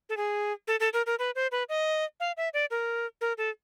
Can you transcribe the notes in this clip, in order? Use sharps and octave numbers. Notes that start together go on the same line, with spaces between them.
A4
G#4
A4
A4
A#4
A#4
B4
C5
B4
D#5
F5
E5
D5
A#4
A#4
A4